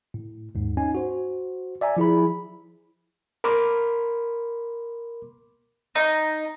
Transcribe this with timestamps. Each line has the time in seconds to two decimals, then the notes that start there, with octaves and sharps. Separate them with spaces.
0.14 A2
0.55 D#2 G#2
0.77 C#4 D#4 G#5
0.95 F#4 C5
1.81 D5 E5 G#5 A#5
1.97 F3 E4 G#4 B5
3.44 A#4 B5 C6 D6 F6
5.95 D#4